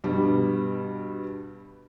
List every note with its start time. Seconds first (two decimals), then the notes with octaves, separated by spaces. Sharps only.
0.04 G2 B2 G3 B3